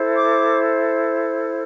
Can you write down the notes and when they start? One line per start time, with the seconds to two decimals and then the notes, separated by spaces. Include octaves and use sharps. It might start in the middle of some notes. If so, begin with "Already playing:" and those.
Already playing: E4 A4 C5
0.14 D6